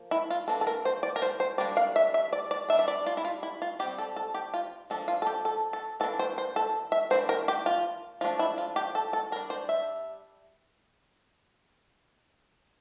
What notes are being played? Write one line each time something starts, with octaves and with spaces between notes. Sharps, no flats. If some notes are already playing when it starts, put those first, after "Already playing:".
Already playing: F3 A#3
E4
F4
E3 A#3 D4 A4
A4
A#4
C5
D5
A#4
C5
C5
G3 A#3 D4 D5
F5
E5
E5
D5
D5
G3 D4 E5
E5
D5
F4
E4
F4
E4
F4
G3 C4 G4
A4
A4
G4
F4
F3 A#3 D4 A4
F4
A4
G4
A4
A4
E3 A#3 D4 A4
C5
C5
A4
E5
E3 A#3 D4 C5
A#4
G4
F4
F3 A3 D4 F4
E4
F4
G4
A4
A4
G3 D4 A#4
C5
E5